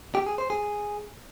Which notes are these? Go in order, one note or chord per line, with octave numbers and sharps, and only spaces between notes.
G4
G#4
C5
G#4